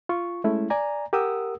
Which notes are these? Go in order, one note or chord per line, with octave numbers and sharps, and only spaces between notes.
F4 C#6
G#3 A3 C#4 E4
D5 G#5 A#5
G4 A#4 F#5 D#6 E6